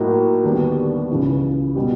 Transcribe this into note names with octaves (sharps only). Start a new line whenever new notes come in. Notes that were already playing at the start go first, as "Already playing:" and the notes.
Already playing: A2 F#3 A#3 D#4 F#4
D#2 D3 G3 B3 D4
C#2 C#3 E3
B2 G3